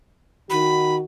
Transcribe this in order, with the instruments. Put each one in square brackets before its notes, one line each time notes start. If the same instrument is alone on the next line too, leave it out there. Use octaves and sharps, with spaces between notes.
[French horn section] D#3 F#4 [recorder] B5